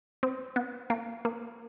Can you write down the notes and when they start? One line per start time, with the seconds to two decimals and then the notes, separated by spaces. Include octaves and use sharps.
0.23 C4
0.56 B3
0.90 A#3
1.25 A#3